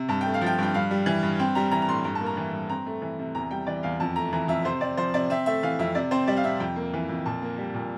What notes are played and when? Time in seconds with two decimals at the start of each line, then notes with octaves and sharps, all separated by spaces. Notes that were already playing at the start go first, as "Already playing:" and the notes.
Already playing: C3
0.08 G2 A5
0.21 A3 G5
0.34 F5
0.41 F3
0.46 G5
0.58 G2 G5
0.74 G2 F5
0.91 G3
1.06 E3
1.23 G2
1.39 C4 G5
1.55 G3 A#5
1.71 E3 A#5
1.82 A#5
1.88 A2 C6
2.04 G2 A#5
2.15 A5
2.21 A#3
2.26 A#5
2.37 E3
2.53 G2
2.69 C4 A#5
2.86 A3
3.02 E3
3.19 C3
3.35 E2 A#5
3.51 G3 G5
3.67 E3 D5
3.83 E2 F5
4.00 F2 A5
4.16 A3 A#5
4.33 E3 A#5
4.48 F2 E5
4.65 C3 C5
4.81 C4 D5
4.97 F3 C5
5.14 C3 D5
5.30 C4 E5
5.46 A3 E5
5.63 E3 F5
5.79 F2 E5
5.95 C3 D5
6.11 C4 C5
6.27 G3 D5
6.37 F5
6.44 C3 E5
6.60 F2 G5
6.76 A#3
6.94 E3
7.09 F2
7.26 A#2 A5
7.42 A#3
7.58 G3
7.74 A#2